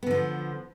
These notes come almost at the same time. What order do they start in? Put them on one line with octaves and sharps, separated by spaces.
B3 D3 F3